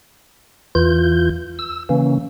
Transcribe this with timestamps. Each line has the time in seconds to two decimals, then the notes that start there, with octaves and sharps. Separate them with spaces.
0.75 E2 E3 F4 G6
1.59 E6
1.89 C#3 E3 A#3 C#4